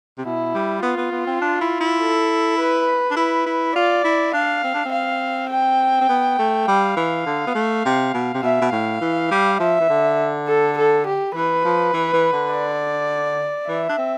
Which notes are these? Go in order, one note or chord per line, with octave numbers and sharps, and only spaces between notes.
C3
B2 E4
G3
B3 F4
B3
B3
C4
D4
E4
E4
A4
B4
D4
E4 B4
E4
F4 D5
E4
D4 F5
C4
D4
C4
F5
G5
C4
B3
A3
G3 F5
E3
D3
B3
A3
C3
B2
C3
B2 E5
B2
A2 F5
E3
G3
F3 E5
E3
D3
A4
A4
G4
E3 B4
F3
E3
E3
D3
D5
E3 E5
D4
C4